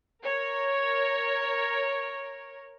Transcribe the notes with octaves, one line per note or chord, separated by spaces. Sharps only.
A#4 C#5